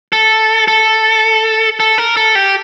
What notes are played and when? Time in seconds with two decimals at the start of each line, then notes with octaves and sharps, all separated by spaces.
0.12 A4
0.68 A4
1.80 A4
1.98 A#4
2.17 A4
2.35 G4